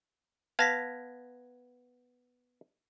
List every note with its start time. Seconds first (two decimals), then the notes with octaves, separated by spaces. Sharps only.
0.59 B3 F5 A5 G#6 A#6 B6